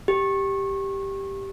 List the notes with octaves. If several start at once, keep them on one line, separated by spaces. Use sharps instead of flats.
G4